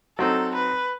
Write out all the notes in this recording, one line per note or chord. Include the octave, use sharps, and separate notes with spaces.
F#3 C4 D#4 A4
B4